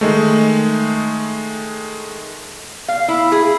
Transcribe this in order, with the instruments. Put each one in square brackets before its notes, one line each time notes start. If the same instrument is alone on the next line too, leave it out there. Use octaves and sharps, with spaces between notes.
[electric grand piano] D#3 G#3 A3
[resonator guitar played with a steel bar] F5
E4
G#4